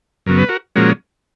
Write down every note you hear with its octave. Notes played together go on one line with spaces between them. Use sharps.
F#2 C#3 F#3 B3 A#4
B4
F#4 A#4
A#2 F3 G#3 C#4 F#4 A#4